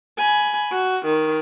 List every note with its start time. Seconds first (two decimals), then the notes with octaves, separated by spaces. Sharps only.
0.18 G#5 B5
0.71 F#4
1.06 D#3